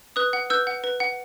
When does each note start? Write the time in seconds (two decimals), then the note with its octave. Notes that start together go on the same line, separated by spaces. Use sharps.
0.16 B4 D#6 F#6
0.33 F#5
0.50 B4 E6 G6
0.67 F#5
0.84 B4
1.00 F#5